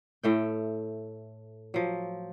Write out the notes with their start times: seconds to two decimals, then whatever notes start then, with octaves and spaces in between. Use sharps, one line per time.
0.23 A2 A3 G5
1.74 F3 F#3